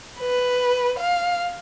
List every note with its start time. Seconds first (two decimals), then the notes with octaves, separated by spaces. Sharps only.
0.21 B4
0.99 F5